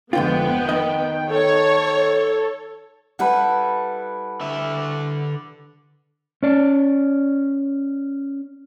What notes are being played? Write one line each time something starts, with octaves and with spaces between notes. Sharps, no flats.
F1 G#2 D3 F3 B3 F4 G5
D#3 D#5
A4 C#5
G3 E4 A4 B4 F#5
D3 E5
C#4 D5